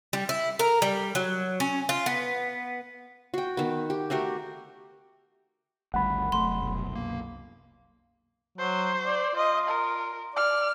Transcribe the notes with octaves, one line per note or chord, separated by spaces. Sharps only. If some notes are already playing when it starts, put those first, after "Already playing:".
G3
E4
A#4
G3
F#3
C#4
F4
B3
F#4 G5
D#3 B3
G4
A3 F#4 G4 A#4
G#1 D2 G3 F#5 B5
F1 F#3 A3 C6
C2 F#2 B2
A#3
F#3 C5
D5
F4 D#5
A#4
D5 F6